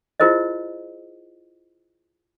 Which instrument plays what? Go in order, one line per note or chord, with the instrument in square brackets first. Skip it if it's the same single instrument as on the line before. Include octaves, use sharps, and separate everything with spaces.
[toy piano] E4 F4 G#4 A#4 C5 D#5